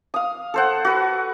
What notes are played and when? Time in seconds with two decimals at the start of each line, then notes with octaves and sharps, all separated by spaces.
0.14 F5 D#6
0.54 A4 C5 F#5
0.85 F#4 B4